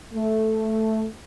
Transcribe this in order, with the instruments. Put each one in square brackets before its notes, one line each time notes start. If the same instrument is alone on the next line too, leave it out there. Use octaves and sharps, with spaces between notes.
[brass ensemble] A3